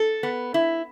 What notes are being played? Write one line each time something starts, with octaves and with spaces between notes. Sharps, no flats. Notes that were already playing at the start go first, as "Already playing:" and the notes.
Already playing: A4
B3
E4